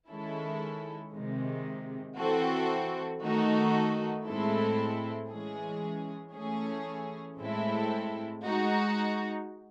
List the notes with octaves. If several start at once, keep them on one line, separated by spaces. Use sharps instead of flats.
D#3 G#3 C#4 E4 A4
C3 D#3 G#3
E3 C4 F#4 A4
D#3 A3 D#4 F#4 A4
A2 G#3 C4 E4 A4
E3 G#3 C#4 G#4
E3 A3 C#4 G#4
A2 G#3 C4 E4 A4
G#3 D#4 F#4